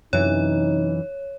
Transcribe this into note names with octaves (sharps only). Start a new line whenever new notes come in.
F#2 C3 E3 D#4 C#5